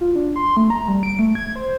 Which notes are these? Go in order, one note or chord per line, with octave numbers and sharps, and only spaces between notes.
F4
D4
C6
A3
A#5
G3
D7
A3
G#6
C5